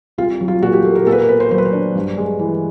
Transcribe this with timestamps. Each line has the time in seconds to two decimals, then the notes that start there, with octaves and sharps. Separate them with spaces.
0.18 C2 F4
0.41 F#3
0.48 F4
0.62 A#2 F#4
0.73 G4
0.85 A#3 A4
0.95 A#4
1.07 A#2 A4
1.12 B4
1.17 A#4
1.29 B3 B4
1.40 C5
1.51 F#3 C5
1.58 B4
1.65 C5
1.73 D4
1.95 G2
2.17 G#3
2.39 E3